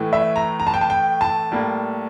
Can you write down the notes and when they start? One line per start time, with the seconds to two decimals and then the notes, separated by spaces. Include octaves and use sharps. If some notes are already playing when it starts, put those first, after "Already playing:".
Already playing: A2 E3 A3
0.13 E5
0.36 A#5
0.60 A#5
0.67 A5
0.74 G5
0.81 A5
0.90 G5
1.21 A5
1.52 A2 G3 A#3